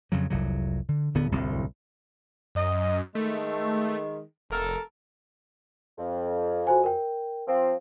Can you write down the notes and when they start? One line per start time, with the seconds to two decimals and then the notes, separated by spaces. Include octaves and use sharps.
0.12 F2 C#3 F#3
0.30 F1 C2 F#3
0.89 D3
1.15 D1 D3 B3
1.32 D1 C2 F#2 C4
2.55 F#2 D#5
3.15 D#3 G#3 A3
4.50 F1 A4 A#4
5.98 F2
6.67 F#4 C5 G#5
6.84 A#4 G5
7.47 F3 C4